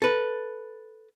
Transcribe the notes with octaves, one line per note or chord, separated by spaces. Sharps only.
A4 B4